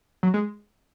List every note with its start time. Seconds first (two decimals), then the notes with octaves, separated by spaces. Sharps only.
0.23 F#3
0.34 G#3